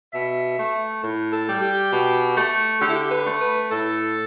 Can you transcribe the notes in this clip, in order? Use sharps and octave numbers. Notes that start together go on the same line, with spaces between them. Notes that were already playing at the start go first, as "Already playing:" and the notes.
B2 E5
A3
A2
A4
G3
G4
B2
A3
D3 G4
E4
G4
B4
A3
B4
A2 A4